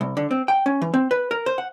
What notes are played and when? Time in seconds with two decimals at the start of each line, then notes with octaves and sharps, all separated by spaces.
0.01 C2
0.17 D3
0.31 C4
0.48 G5
0.66 C#4
0.81 E3
0.94 C4
1.11 B4
1.31 A#4
1.46 C5
1.58 F#5